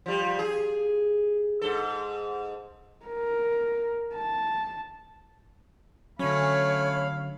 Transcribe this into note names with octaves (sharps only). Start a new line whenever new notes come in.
F3 G3
G#4
G#2 A4
A#4
A5
D3 F#3 A3 C#4 C#5 F5 B5